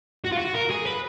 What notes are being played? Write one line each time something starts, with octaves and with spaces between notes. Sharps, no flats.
F#4
F4
F#4
A#4
G#4
B4